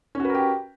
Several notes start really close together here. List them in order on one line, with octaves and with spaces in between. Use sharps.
C#4 F#4 B4 A#4 G4